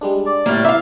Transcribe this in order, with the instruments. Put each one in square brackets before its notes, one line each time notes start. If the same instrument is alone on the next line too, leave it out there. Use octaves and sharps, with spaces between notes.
[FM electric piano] G3 G#3 D4
[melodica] D5
[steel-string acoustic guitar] A2 G3 A#3 [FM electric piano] A6
[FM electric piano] E4 [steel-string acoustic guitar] E5 F5 [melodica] E6